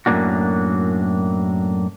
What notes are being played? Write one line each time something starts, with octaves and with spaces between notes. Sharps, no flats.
F#2 A2 C3 A#3 D4 F#4